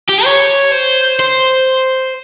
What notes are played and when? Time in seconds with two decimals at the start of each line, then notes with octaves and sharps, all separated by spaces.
0.09 G4
0.25 C#5
0.72 C5
1.19 C5